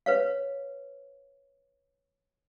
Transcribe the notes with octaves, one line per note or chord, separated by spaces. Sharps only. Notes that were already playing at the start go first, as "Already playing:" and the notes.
B4 C#5 F5